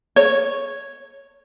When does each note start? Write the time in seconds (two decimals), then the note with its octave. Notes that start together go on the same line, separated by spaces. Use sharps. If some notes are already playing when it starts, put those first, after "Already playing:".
0.16 C#5